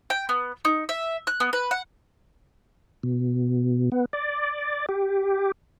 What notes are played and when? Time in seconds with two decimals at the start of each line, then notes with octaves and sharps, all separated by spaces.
0.10 G5
0.29 B3
0.65 D#4
0.89 E5
1.27 F#6
1.40 B3
1.53 B4
1.71 F#5
3.03 B2
3.92 B3
4.13 D5
4.89 G4